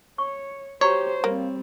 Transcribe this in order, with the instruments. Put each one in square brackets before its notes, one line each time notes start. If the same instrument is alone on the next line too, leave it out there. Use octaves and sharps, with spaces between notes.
[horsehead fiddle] C#5 [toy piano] C#6
[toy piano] F#4 A#5 C#6 [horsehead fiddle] G4 C5 [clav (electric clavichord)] C#5
[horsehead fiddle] G3 C4 [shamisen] A#3